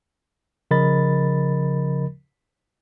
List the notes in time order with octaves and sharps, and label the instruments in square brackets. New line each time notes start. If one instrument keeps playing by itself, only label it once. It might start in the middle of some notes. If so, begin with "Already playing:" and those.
[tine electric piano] C#3 F3 A#4 D#5 B5 A6